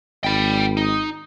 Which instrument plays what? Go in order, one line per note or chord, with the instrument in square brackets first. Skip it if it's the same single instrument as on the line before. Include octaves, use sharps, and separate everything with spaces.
[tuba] G#1 [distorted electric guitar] G5 B5
[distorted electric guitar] D#4